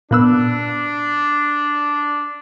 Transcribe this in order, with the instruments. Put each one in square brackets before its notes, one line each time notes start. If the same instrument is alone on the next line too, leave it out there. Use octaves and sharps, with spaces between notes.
[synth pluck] A#2 B3 E6 [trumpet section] D4